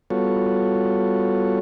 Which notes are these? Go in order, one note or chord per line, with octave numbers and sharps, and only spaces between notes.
G3 B3 F4 F#4 A4 C#5